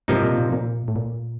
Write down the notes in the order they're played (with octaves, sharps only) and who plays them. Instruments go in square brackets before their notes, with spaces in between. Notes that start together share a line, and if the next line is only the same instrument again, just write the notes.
[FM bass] G2 [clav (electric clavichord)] C3 F3 A#3 D#4
[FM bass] A#2
A#2
A#2
A2
A#2